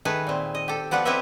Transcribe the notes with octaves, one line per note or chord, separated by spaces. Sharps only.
D#3 A3 G#4 B4
A#2 C4
D#5
G4 A4
F3 B3 B4 D5 F#5
C4 E4 G4 B4 D#5 E5